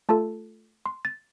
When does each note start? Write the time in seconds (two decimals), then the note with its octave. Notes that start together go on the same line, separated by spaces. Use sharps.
0.09 A3 F4 A4 A5
0.86 C6
1.05 A6